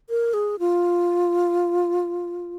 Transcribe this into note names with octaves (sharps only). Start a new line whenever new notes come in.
A#4
G#4
F4